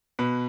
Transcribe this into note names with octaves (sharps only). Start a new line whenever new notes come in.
B2 B4